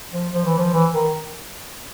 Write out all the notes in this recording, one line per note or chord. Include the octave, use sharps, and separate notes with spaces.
F3
F3
E3
F3
E3
D#3